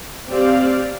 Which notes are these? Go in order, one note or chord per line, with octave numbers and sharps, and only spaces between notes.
C4 G4 D5 F5